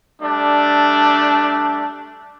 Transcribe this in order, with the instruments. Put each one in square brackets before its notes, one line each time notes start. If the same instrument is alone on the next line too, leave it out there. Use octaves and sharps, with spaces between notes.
[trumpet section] G3 A3 D4